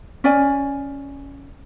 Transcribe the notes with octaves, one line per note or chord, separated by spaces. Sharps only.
C#4 D5 G#5